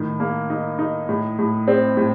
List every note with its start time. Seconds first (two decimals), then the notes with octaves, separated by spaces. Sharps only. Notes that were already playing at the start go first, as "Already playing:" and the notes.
Already playing: A2 D#3
0.20 A#3
0.50 D#4
0.79 D#4
1.09 A2
1.39 A2
1.68 C4
1.97 A2